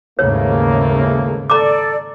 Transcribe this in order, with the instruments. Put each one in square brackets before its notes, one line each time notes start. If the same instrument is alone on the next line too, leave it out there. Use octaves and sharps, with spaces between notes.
[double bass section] D#2 G#2 C#3 [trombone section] E3 A3 A#3 [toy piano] C#5
[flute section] A4 D5 [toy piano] A#5 D6